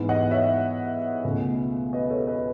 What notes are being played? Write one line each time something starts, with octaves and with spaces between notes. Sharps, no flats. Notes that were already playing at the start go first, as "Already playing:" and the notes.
Already playing: G#2 E3 B3
D#5 F#5
C#5 E5
C#2 B2 A3 C#4
B4 D#5
A4 C#5
B4 D#5